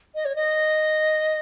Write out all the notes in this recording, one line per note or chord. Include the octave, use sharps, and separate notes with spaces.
D#5
C#5
D#5